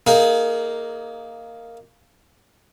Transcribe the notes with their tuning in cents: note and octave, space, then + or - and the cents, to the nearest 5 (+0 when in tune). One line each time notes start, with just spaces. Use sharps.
A#3 -5 D#4 +5 G#4 +25